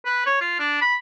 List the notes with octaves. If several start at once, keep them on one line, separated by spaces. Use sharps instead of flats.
B4
C#5
F4
D4
B5